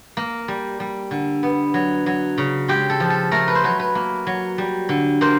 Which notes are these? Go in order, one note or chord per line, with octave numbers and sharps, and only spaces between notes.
A#3
G3
G3
D3
B3
F#3
F#3
C#3
G#3 G4
A4
F3
A4
A3 A#4
B4
C5
F#3 B4
B4
A#3
F#3
G3
D3
A#3 C5